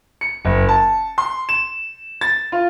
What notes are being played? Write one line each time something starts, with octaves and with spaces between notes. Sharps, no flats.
C#7
F#1
A5
C6
E7
A6
F4